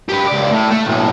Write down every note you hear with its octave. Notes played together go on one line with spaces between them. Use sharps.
G4 B4
C#2 D5
A2
A3 A4
B1 A2